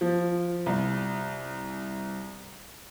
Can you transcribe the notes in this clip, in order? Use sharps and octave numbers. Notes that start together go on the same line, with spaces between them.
F3
C2